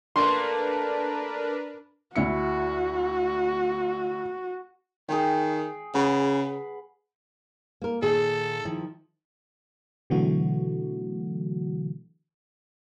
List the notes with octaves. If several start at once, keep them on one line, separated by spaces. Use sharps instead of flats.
A3 A#3 D4 A#4 B4 C6
D2 E4 F#4 C#7
D#3 G#4 G5
C#3 B4 F#5
A#3 A#4
A#2 D#3 G#4 A4
D#3 F3 E4
B2 D3 E3 F#3 A3 F#4